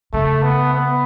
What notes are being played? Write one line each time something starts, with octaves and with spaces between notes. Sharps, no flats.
C#3 A3
B3
B3